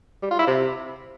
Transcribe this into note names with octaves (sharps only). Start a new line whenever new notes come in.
G3
F4
E4
C3